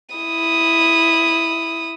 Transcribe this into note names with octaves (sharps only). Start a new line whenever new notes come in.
E4 D#6